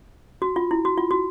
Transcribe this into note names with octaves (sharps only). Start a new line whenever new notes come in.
F#4
F4
E4
F#4
F4
F#4